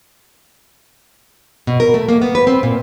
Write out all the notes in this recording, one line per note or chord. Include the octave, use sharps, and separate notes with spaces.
B2
A#4
A3
A#3
B3
B4
C4
A#2